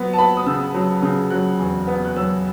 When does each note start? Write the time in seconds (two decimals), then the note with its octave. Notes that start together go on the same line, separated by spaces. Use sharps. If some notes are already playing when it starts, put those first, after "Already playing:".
Already playing: F#3 B3
0.13 A5
0.17 B3 B5
0.37 D#6
0.46 C#3 E6
0.74 F#3
1.03 C#3
1.31 F#3 F#6
1.59 E2
1.87 B3
2.05 F#6
2.16 F#3 E6